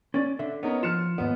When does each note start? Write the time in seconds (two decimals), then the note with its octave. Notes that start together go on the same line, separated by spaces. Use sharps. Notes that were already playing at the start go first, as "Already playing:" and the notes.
0.14 C#4 D5
0.39 D3 E5
0.63 B3 C#4 D#4 A#4
0.83 F3 F4 F6 C#7 E7
1.18 D#2 G#2 B3